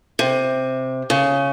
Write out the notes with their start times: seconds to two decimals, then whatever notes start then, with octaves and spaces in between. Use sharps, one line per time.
0.19 C3
1.10 C#3